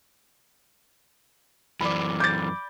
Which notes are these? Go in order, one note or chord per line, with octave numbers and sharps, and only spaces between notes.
F#2 E3 D5 B5
D6 G6 A6